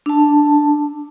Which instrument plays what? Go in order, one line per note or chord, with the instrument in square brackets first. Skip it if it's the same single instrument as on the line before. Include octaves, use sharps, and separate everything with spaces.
[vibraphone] D4 A5